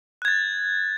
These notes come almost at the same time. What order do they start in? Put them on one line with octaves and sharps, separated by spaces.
F#6 G#6 A6